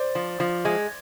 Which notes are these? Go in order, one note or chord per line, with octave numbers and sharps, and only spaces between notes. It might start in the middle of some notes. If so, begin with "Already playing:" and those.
Already playing: C5 D5
F3
F3
G#3